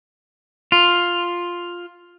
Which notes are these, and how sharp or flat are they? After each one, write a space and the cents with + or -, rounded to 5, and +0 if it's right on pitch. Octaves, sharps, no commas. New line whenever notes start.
F4 +5